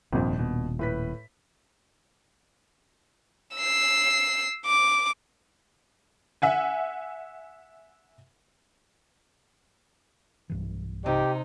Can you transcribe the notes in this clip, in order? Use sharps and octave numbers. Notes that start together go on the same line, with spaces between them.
D#1 G#1 F2 A#2 D4
B2
A2 B4 B6
E6 C7
D6
E5 F#5 G#5
B1 G2 E3
C3 D#4 G4